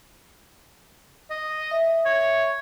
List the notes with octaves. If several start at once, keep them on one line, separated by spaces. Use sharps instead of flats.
D#5
E5
C#5